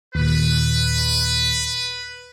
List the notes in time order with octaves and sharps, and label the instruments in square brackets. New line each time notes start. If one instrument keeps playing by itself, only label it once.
[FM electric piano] D#2 A#2 [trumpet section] B4